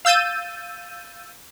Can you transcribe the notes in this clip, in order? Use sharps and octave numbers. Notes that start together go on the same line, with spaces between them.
F5 E6 G6 A6 D#7